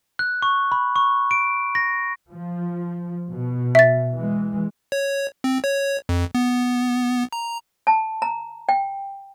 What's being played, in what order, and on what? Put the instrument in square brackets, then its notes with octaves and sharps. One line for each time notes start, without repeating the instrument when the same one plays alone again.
[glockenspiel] F#6
C#6
B5
C#6
D7
A#6
[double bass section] F3
B2
[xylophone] E5 A6
[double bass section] E3 G#3
[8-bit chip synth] C#5
C4
C#5
F2
B3
A#5
[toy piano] A5
A#5
G5